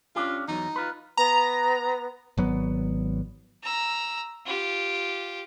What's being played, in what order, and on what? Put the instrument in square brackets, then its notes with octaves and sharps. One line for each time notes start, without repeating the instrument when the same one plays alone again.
[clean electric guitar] C#4 D4 G4 [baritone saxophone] F4
[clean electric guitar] E2 F#3 [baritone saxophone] D#4
[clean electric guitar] F4 B4
[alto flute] B3 [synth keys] A#5
[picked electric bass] G#1 F#3 B3
[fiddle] A#5 E6
F4 G4